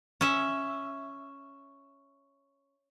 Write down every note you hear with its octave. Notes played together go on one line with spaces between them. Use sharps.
C#4 E5